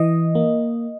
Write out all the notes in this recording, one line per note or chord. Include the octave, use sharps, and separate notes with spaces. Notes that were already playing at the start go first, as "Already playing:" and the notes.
Already playing: E3 D#5
A#3